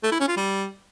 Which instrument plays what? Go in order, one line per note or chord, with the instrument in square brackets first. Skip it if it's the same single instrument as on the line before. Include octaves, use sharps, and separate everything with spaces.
[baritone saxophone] A3
E4
C#4
F4
G3